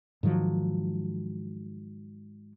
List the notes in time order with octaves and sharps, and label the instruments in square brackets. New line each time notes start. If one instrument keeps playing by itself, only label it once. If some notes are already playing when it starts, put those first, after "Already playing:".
[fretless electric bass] G#2 D#3 F3 F#3